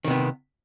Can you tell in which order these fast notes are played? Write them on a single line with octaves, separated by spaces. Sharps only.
D#3 C3 B3